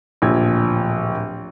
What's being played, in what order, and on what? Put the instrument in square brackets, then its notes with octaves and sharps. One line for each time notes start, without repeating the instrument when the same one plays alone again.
[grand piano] D1 A#1 F3 G4 G5 G#6